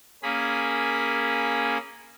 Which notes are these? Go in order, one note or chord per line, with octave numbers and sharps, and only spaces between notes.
A#3 C#4 G#4 B5